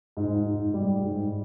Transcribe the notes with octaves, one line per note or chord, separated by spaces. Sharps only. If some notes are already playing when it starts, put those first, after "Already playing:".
G#2
G#2
G3
G#2